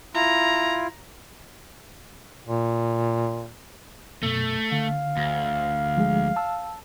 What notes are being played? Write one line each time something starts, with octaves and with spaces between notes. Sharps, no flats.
E4 F4 A#5
A#2
F#2 B2 A3
D3 F5
D2
F3 G#3 G#4
A5 E6